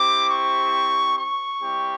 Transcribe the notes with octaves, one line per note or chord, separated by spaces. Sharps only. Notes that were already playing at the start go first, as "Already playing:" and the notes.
Already playing: C4 E4 G4 D6
C#6
C#6
G3 C4 E4 G4